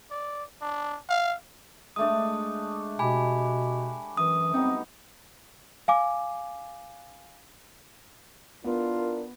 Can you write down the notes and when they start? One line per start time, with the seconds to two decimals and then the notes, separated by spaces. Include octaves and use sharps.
0.11 D5
0.61 D4
1.09 F5
1.96 G#3 A3 D4 D#6
2.99 B2 G4 G#5 B5
4.17 F#2 E3 D#6
4.54 G3 B3 C4 D#4
5.88 F5 G#5 D6
8.65 B3 D4 E4 F4 A#4